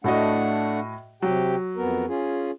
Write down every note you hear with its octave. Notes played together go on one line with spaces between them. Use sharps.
A2 A3 D4 F#4 D#5 F#5
C3 F#3 G4 G5
F2 B3 A#4
C#4 F4 G#4